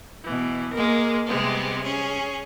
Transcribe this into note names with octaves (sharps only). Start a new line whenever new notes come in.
B2 E3
G#3 A#3 A#4
C3 G3 G#3 B3 C4
C#4 G#4